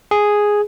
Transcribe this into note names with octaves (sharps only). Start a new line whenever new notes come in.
G#4